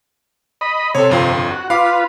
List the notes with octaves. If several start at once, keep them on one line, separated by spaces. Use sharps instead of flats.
D#5 B5
C3 A4 C#5
G1 F2 F4
F#4
F4 B4 F5 D6